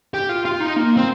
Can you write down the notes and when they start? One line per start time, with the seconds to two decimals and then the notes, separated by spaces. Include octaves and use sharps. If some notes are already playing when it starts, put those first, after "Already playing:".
0.14 G4
0.29 F4
0.45 F4
0.60 D#4
0.76 A#3
0.97 C4